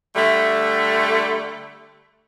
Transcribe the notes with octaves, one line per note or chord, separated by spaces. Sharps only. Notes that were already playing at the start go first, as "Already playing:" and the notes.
D3 G3 A3